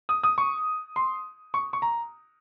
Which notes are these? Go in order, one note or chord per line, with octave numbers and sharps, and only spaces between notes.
D#6
D#6
C#6
C6
C#6
C#6
A#5